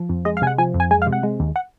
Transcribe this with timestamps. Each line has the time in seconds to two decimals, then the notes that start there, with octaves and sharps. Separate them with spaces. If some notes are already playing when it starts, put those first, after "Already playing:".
Already playing: F3
0.09 F2
0.25 G#3 D#5
0.37 F5
0.42 C3 G#5
0.47 F#5
0.58 F3 G#5
0.74 F2
0.80 G#5
0.91 G#3 G#5
1.02 F5
1.07 C3
1.13 F#5
1.23 G#3
1.40 D#2
1.56 F#5